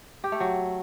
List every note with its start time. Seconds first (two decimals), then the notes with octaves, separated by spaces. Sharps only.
0.24 G4
0.32 A3
0.40 F#3